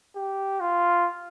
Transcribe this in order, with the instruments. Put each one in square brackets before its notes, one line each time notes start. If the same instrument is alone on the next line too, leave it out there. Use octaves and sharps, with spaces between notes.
[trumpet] G4
F4